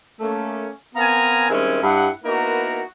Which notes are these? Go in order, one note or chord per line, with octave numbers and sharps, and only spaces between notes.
A3 A#3 C#4
B3 C4 A#4 F5 G#5 A#5
D#3 G3 G#3 C4 C#4 E4
G2 G3 E4 F#5
A#3 B3 D#4 E4 F#4 A#4